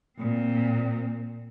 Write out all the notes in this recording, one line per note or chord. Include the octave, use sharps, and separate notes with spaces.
A#2 C4